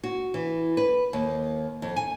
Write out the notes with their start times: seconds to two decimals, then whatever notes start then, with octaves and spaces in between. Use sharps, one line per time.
0.04 F#4
0.34 E3
0.77 B4
1.13 D#2
1.82 F2
1.96 G#5